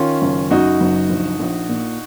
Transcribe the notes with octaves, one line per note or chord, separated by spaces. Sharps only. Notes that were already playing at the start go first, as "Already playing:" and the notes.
Already playing: D#3 C#4 F4
F#1
F#2 D#4 F#4
F#1
A#1
A#1
A#2